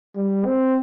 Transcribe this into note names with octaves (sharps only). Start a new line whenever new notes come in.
G3
C4